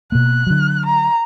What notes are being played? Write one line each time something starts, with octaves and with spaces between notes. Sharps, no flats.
B2 A#3 F#6
D3 F#3
A#5